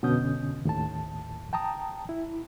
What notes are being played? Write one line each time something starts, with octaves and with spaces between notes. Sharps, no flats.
F2 B2 D3 C#4 D#6 G6
D#2 A2 A5
G5 A5 A#5 D#6
E4